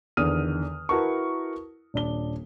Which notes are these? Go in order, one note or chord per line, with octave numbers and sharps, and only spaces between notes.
E2 D3 D#3 D#6 F6 D#7
E4 F#4 A#4 B4 A5 C#6
D#1 D4 G7